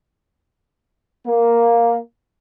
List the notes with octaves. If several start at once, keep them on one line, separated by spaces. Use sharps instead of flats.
A#3